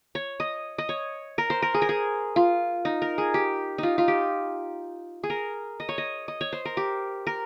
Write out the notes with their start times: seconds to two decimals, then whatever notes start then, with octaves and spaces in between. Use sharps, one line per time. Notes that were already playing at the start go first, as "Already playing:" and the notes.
0.15 C#5
0.40 D#5
0.78 D#5
0.89 C#5
1.38 A#4
1.50 C5
1.62 A#4
1.74 G#4
1.82 A#4
1.89 G#4
2.36 F4
2.85 D#4
3.02 A#4
3.18 G#4
3.34 G4
3.78 D#4 F4
3.98 F4
4.08 G4
5.23 G#4
5.30 A#4
5.80 D#5
5.89 C#5
5.98 D#5
6.28 D#5
6.41 C#5
6.53 C5
6.65 A#4
6.77 G4
7.27 A#4